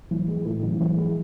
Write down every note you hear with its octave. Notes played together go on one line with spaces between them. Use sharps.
E3
G#3
A2
A1
E3
G#3